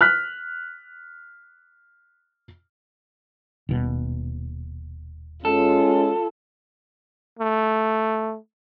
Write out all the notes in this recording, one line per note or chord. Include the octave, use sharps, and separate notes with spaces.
F6 F#6 B6
D#1 B2
G#3 C#4 F4 A4
A3